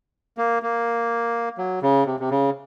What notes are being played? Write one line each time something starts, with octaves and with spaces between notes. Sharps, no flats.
A#3
A#3
F#3
C#3
C3
C3
C#3